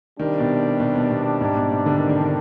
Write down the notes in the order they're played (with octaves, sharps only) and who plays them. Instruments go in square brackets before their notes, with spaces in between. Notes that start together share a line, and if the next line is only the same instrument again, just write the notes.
[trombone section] C3 G3 D4 [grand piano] D#3
[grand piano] B2
B2
B2
B2
G#2
B2
B2
D3
D#3
D3
D#3